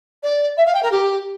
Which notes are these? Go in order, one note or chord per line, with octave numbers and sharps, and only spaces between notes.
D5
E5
F5
G5
A#4
G4